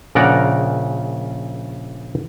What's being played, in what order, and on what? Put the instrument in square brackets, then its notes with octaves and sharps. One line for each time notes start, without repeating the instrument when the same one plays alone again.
[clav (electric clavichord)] A#1 C#3 A#4 D5 F#5 A#5